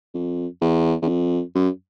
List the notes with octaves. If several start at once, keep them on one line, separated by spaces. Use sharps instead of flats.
F2
E2
E2
F2
F#2